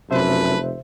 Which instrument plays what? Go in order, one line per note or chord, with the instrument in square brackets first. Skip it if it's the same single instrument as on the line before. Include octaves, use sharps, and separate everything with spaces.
[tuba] F1 [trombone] F#2 [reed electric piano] C3 C5 E5 [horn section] E3 A4 B4